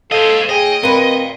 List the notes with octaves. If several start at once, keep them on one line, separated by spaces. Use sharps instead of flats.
A4 C5 D#5 F5
G#4 C#5 D#5 G5
C4 A#4 B4 D5 F5